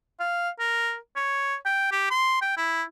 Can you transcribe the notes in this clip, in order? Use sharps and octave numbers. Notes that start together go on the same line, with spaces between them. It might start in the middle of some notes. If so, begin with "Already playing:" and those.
F5
A#4
C#5
G5
G4
C6
G5
E4